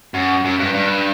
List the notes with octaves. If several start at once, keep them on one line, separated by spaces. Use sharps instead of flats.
F#2
F#2
G2
G2